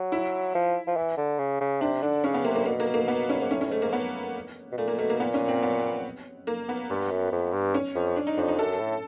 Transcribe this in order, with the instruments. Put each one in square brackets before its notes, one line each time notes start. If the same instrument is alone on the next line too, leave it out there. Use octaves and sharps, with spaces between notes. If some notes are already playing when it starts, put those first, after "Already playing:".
Already playing: [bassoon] F#3
[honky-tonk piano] E4
[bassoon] F3
F3
E3
D3
C#3
C#3
[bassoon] C3 [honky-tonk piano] D4
[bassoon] D3 [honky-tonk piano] D4
[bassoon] C#3 [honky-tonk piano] C#4
[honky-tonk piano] B3
[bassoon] C3 [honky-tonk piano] A#3
[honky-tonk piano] A#3
[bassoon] B2 [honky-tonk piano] A#3
[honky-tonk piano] A#3
A#3
B3
C#4
[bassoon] G#2
[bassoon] A2 [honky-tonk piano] C#4
[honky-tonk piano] C#4
[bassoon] G#2 [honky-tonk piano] A3
[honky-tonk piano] A#3
B3
[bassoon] B2
[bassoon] A#2 [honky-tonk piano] A3
[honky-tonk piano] A#3
[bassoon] B2 [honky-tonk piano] A3
[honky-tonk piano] A#3
[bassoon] A#2 [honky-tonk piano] B3
[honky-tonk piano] C#4
C4
B3
A#3
B3
[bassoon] G2
F#2
F2
G2
[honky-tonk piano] C#4
[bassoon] F2
[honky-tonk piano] D4
D#4
[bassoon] F2 [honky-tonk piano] D4
[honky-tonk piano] D#4
[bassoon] F#2 [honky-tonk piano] A4
[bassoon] A2